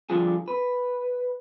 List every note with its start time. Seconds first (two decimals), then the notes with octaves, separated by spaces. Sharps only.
0.10 D3 F3 G3 F4 G#4
0.48 B4